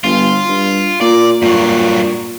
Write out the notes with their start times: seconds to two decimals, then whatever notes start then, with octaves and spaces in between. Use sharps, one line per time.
0.04 G1 F4
0.48 G2
1.01 A#2 D5
1.42 G2 A#2 F#3